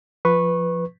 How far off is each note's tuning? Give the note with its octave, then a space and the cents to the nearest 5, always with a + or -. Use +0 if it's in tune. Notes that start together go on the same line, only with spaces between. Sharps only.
F3 +0 B4 +0 C#6 -20